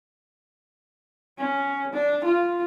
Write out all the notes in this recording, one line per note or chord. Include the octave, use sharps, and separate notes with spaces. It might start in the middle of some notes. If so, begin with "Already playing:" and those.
C#4
D4
F4